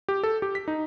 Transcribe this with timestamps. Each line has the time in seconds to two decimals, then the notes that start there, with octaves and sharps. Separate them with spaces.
0.09 G4
0.23 A4
0.42 G4
0.55 B6
0.68 D#4